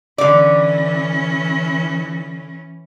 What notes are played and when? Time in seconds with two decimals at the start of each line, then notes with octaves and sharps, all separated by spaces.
0.18 D3 E3 C#4 D5